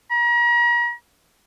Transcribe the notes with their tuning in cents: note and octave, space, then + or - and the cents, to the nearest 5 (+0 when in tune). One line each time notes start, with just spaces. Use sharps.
A#5 +40